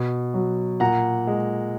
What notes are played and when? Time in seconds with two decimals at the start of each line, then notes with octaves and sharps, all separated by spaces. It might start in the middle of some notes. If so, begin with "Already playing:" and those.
Already playing: B2
0.34 F#3
0.80 A#2 F#5 A#5
1.27 G#3